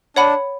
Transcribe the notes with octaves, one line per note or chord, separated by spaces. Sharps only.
D4 C#5 F#5 B5